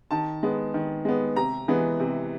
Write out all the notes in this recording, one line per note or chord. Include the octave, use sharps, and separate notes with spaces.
D#3 A5
G#3 B3
D#3
G#3 B3
C3 A#5
E3 G#3 B3
C3